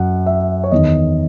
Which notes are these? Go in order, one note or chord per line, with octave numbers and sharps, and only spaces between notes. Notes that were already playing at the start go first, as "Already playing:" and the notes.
Already playing: F#2 F#5
E5
C#5
E2 D#3 D#5